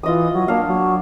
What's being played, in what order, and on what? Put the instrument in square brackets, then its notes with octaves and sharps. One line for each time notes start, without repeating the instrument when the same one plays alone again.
[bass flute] E3 [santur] F4 D#5 D#6
[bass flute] F#3
[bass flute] A#3 [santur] D4 F5
[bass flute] F#3